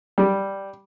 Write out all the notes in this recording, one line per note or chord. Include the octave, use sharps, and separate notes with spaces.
G3